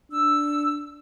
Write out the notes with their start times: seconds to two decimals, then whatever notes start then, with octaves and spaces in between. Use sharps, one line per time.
0.12 D4 E6